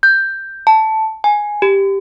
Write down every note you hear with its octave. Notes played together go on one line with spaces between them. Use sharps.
G6
A5
G#5
G4